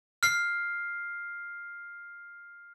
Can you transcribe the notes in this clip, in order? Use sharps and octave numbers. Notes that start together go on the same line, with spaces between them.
F6 C7